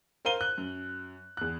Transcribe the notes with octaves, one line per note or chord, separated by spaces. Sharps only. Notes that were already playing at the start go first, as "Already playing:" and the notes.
A#4 C5 F5 D#7 G7
F#6
F#2
E2 F#6